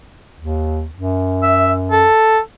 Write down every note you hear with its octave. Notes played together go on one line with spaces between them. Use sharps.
D#2
F#2
E5
A4